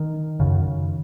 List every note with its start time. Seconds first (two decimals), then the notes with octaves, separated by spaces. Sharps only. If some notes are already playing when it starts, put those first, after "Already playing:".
Already playing: D#3
0.40 F#2 C#3